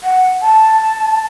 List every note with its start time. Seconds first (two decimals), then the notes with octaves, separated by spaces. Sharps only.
0.04 F#5
0.42 A5